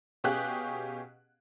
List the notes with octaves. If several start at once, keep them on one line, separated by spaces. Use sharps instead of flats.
B2 C#4 G4 G#4 F5 F#6